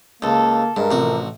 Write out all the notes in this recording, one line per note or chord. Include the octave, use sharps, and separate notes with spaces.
C#2 A#3 A4 A5
G2 G#3 A#4
A1 C3 F3 F#4